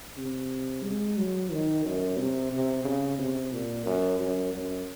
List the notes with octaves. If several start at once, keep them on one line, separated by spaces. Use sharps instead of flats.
C3
G#3
F#3
D#3
F#2
C3
C3
C#3
C3
A#2
F#2
F#2
F#2